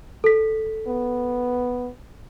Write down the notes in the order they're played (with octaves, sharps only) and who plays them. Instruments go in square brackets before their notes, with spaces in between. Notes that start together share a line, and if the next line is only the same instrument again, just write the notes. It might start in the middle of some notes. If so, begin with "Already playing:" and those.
[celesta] A4 B6
[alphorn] B3